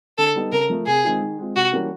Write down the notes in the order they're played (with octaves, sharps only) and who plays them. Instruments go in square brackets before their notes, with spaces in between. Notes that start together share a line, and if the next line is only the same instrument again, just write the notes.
[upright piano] D3 [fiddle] A4
[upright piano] G3 B3 D#4
[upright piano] C#3 [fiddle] A#4
[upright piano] F3 A3
[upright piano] C3 [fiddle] G#4
[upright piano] D#3 G#3 C4 F4
D#3
G#3 C4 F4
[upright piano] C3 [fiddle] F#4
[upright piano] E3 G3 A#3 C#4